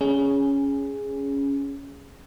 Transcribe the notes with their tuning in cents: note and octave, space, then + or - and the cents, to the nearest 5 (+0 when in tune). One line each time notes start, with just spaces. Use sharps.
C#4 +5 G#4 -5